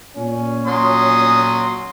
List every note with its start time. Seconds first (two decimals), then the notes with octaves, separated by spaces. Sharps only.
0.17 A#2 C#4
0.67 A#2 F#3 C6 D#6